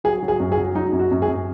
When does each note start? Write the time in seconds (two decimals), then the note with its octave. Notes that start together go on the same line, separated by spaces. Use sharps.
0.04 F#3 G#4
0.22 F#3
0.28 G#4
0.40 F#2
0.52 G#4
0.57 F#3
0.75 F#3 D#4
0.92 F#2
0.99 F#4
1.11 F#2
1.22 G#4
1.28 F#2